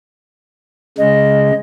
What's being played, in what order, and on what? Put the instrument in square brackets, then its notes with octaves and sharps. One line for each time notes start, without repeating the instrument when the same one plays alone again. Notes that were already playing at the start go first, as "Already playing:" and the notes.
[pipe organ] C#3 G#3 [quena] D#5